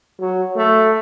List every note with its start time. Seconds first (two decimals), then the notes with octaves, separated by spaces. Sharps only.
0.20 F#3
0.56 A3